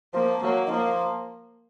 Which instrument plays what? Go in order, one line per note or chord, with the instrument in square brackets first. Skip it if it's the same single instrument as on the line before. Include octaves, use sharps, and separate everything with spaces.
[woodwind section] F3 [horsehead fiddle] A#3
[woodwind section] F#3 [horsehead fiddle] A#3
[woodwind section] D#3
[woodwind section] F3 [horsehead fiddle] A#3